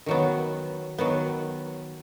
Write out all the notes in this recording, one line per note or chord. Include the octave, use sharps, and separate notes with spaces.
D#3 F#3 B3
D#3 F#3 B3